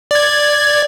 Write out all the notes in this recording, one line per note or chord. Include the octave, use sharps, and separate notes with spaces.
D5 G#6